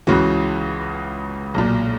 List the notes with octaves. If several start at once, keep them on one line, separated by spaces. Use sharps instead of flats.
C#2 C#3 E3 F#4
B1 A#2